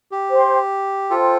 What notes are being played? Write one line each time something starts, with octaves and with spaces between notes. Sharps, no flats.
G4
C5 G5 C6
F4 A4 C5 G5 C6